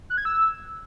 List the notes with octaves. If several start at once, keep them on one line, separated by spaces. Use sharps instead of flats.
F#6
G#6
E6